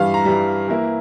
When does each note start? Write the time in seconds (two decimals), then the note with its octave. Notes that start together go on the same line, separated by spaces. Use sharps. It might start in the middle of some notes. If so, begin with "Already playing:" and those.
Already playing: G2 E3 G3 F5
0.14 A#5
0.25 G2 E3 G3
0.68 E3 A#3 E4